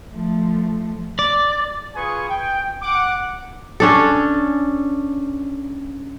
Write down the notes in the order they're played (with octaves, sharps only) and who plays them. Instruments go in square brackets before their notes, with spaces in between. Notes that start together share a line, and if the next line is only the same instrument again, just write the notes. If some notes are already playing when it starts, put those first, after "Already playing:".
[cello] F3 A3
[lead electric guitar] D5
[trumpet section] F4 G#4 B4 G#5 C#6 D#6
G5
F#5 D6
[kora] C#4 D4 A4